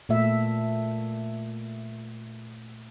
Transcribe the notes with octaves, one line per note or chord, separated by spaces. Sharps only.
A#2 A3 E5